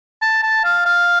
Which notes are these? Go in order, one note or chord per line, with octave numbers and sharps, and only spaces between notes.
A5
A5
F5
F5